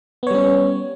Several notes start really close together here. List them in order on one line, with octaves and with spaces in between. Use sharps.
B3 C#5 G3 C#4